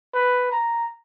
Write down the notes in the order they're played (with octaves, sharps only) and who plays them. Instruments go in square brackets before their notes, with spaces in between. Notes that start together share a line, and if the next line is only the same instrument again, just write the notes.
[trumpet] B4
A#5